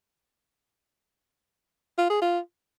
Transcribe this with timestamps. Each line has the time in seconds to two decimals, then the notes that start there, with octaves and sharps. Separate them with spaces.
1.98 F4
2.10 G#4
2.22 F4